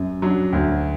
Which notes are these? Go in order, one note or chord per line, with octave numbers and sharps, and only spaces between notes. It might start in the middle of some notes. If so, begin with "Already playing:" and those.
Already playing: F#2
F#3 D4
D2